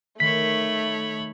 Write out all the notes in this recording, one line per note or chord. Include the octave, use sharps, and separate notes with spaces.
D#3 A3 C#5 B5 B6